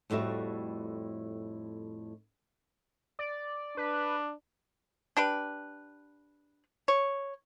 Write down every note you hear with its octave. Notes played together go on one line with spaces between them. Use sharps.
F2 A2 G3 F#4 E5
D5
D4 B4
D4 G4 B4
C#5